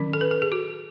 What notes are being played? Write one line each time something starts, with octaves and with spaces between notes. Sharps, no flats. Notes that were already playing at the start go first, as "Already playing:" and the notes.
Already playing: D#3 F#3 C#4
A4
B4
A4
G#4
F#4